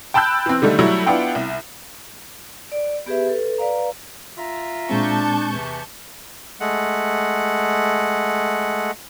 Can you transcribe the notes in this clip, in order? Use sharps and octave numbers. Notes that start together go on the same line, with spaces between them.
G5 A5 B5 E6 F#6 G6
E3 C4
D3 D#3 G3 A3
F#3 G3 A3 E4
B3 D4 E4 F4 F#5 G5
C2
D5
B3 G4 G#4 B4 E5
A4 B4
B4 D5 F5 A#5
F4 E5 A#5
A#2 G#3 C4 D4 A5 C#6 G6
E2 C3 E3
G#3 A3 F#5